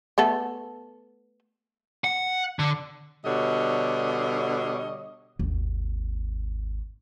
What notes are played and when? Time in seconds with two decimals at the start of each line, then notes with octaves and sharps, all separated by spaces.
0.18 A3 B3 A4
2.04 F#5
2.59 D3
3.25 B2 D3 G3 C#5 D#5
5.39 G#1 D#2